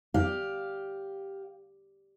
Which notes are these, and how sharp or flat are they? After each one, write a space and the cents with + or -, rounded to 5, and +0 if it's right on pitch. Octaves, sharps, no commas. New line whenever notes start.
G4 +0 D5 +0 F5 +10